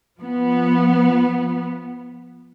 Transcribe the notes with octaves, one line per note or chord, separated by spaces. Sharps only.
F3 B3